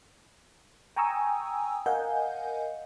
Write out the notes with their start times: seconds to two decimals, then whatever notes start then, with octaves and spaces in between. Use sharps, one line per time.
0.96 G5 G#5 A#5 C#6 D#6 E6
1.86 A#4 D#5 F5 F#5 G#5 G6